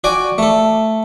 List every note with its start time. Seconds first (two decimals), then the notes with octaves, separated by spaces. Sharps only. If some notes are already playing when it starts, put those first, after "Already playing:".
0.04 F#4 D5 G5 G#5
0.38 A3 A4